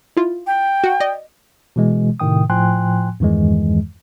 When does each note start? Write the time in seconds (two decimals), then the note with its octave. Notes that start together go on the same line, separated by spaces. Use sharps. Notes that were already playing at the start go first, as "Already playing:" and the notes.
0.17 E4 F4
0.47 G5
0.84 F#4 F#5
1.00 D5 D#5
1.76 B2 E3 G#3
2.20 A2 C3 D#3 G5 D#6
2.50 A2 F3 G5 G#5 C6 F#6
3.20 E2 G2 D#3 E3 G#3